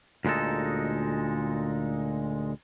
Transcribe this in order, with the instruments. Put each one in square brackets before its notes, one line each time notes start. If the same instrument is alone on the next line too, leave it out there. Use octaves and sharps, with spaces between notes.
[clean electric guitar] D2 A#2 G#3 D#4 A4